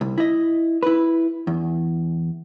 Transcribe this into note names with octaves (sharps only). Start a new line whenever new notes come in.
C2
E4 D#5
E4 B4
E2